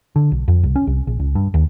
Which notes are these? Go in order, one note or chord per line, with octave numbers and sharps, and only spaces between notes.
D3
B1
F2
C2
C#4
C2
A#1
C#2
G2
D#2